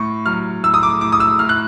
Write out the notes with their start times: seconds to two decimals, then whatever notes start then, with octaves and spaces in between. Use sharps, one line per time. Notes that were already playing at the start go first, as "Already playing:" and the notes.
Already playing: A2 C#6
0.25 F#3 F6
0.63 A2 E6
0.74 D#6
0.83 D6
1.01 A2 D6
1.12 D#6
1.20 E6
1.39 A2 F6
1.49 F#6